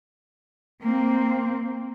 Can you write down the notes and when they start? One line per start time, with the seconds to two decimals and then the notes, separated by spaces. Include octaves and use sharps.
0.83 A#3 C4